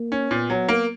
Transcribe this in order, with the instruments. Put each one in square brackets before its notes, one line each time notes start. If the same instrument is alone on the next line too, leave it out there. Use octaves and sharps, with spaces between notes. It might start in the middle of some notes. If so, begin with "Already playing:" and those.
Already playing: [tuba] A#3
[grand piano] C#4
[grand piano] A#2 [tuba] B3
[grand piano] F#3
A#3